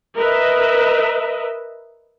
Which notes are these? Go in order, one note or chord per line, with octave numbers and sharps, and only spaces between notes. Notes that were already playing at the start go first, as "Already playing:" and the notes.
A#4 B4 D#5 E5